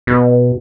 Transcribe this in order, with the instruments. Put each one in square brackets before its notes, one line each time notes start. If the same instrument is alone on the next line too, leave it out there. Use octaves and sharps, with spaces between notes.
[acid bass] B2